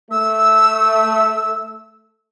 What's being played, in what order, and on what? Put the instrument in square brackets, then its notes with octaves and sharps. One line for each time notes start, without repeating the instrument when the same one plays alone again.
[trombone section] A3 [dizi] E6